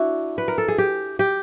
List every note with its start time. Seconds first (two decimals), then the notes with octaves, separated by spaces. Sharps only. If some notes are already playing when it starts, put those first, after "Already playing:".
Already playing: D4 E4 F#4
0.38 B4
0.48 A#4
0.58 A4
0.68 G#4
0.78 G4
1.19 G4